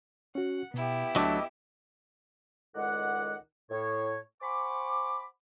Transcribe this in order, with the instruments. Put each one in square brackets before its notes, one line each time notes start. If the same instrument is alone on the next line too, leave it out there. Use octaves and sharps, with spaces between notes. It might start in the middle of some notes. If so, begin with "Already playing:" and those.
[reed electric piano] C#4 F#4 [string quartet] F#5
[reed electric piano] B2 [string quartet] B3 E4 G4
[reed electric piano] D2 D4 A5 [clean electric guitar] F#3 A3 [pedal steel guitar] D#5 D6 E6
[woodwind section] C#2 A2 D#3 G#3 D5 F#5
A2 C#5
C5 F#5 G#5 B5 C#6 D6